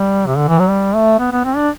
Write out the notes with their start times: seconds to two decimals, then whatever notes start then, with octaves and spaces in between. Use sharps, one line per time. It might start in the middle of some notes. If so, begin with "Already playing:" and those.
Already playing: G3
0.26 C3
0.37 D3
0.48 E3
0.59 F#3
0.70 G3
0.95 A3
1.19 B3
1.32 B3
1.45 C4
1.57 D4